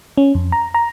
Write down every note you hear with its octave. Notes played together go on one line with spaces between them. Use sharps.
C#4
F2
A#5
A#5